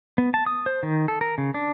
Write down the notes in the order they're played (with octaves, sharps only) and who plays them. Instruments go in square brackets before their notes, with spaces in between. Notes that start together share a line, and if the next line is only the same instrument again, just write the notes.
[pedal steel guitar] B3
A5
D#6
C5
D#3
A4
A#4
C#3
D4